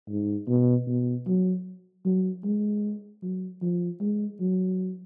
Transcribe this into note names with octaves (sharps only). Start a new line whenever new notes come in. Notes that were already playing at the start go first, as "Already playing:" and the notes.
G#2
B2
B2
F#3
F#3
G#3
F#3
F3
G#3
F#3